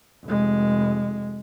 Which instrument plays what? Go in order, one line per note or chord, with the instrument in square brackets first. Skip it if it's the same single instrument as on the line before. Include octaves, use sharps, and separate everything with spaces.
[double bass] F1 G#3